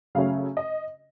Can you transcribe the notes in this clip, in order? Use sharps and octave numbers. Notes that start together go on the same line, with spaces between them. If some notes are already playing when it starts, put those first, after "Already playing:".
C#3 F#3 A3 C#4 F5
D#5